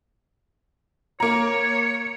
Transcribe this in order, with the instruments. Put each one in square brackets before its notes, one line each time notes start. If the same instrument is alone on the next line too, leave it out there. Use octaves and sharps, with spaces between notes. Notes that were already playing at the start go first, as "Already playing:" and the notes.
[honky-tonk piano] A#3 A#5 [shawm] C#5